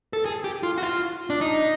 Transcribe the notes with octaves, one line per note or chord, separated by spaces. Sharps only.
A4
G#4
G4
F4
F#4
F4
D4
D#4